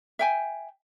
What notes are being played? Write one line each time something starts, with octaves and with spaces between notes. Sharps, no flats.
E5 G5 G#5